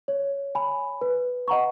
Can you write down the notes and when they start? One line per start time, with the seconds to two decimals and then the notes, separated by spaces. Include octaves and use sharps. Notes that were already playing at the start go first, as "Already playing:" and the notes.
0.08 C#5
0.55 G#5 B5
1.01 B4
1.48 D#5 F#5 A#5 C#6